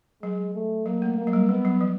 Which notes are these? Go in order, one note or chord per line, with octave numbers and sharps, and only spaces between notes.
F#3 G#3
A3
F#3 A#3
A3
A#3
F#3
G3
G3 B3
F#3
F3